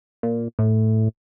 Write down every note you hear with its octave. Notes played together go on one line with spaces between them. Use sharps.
A#2
A2